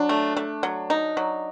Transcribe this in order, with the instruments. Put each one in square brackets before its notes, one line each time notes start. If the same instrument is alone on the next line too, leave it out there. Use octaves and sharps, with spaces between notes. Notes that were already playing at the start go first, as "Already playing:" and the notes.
Already playing: [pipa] F#3 [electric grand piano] D4
[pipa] A3
A3
F#3
D#4
F#3